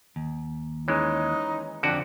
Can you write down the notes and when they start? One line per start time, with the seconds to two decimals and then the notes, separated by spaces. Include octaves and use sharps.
0.16 D#2
0.88 E3 G#3 C#4 D#4
1.83 F2 D3 D4 F#4 D7